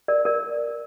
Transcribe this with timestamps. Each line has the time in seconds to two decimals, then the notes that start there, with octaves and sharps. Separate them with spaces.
0.08 A#4 D5
0.25 A#4 D5